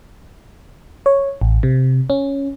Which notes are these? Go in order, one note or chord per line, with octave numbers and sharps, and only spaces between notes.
C#5
A1
C3
C#4